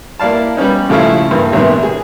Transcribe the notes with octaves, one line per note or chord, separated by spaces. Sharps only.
A#3 E4 D5 F5 A5
G3 B3 C#4 D#4
A1 C#3 F3 A3 E4 F5
G2 E3 A#3
A1 C3 D#3 B3
G#4